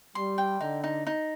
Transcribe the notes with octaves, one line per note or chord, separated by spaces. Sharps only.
G3 C6
G5
D3 D#4
D#4
D#4